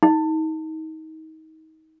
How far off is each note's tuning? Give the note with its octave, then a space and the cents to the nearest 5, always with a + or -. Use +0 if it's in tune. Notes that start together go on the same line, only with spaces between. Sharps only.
D#4 +30